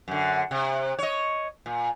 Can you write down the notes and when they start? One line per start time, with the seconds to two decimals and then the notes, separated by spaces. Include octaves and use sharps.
0.08 F#2 D3
0.51 C3
0.99 C#5 D#5
1.66 A#2